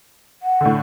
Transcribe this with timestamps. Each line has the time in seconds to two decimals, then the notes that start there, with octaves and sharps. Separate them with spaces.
0.43 F#5
0.61 A2 D3